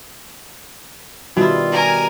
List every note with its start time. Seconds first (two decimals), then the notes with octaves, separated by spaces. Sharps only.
1.37 B2 D#3 G3 E4 F4
1.72 A#4 G#5